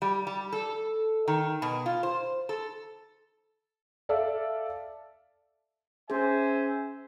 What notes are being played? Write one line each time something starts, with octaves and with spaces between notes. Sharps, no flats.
G3
G3
A4
D#3
B2
F4
C5
A4
A4 D5 E5 F5
C#4 G#4 C5 E5 G#5